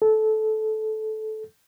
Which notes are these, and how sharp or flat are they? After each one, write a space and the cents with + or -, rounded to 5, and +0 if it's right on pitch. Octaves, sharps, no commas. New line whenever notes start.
A4 -15